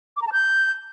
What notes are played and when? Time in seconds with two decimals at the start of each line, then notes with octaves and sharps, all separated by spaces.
0.17 D6
0.22 A#5
0.27 A5
0.32 G6